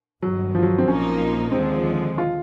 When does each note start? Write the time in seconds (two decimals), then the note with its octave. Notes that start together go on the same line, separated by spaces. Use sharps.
0.22 G1 G2 D#3 F#3
0.55 F3
0.63 F#3
0.78 C4
0.88 A#1 A#2 F3 A#3 C#4 D#4
1.52 D#2 D3 F3 G#3 C4
2.18 F4